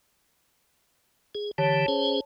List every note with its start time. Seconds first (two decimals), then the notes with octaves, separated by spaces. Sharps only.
1.35 G#4
1.58 D3 E3 G4 C#5 A5
1.88 C#4 G#4 C5